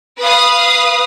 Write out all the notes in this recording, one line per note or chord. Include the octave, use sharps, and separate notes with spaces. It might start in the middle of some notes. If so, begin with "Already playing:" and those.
B4 F5 D#6